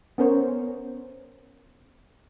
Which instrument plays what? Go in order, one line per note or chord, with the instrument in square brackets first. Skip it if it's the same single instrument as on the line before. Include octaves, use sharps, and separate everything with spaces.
[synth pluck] B3 C#4 A#4 C5 C#5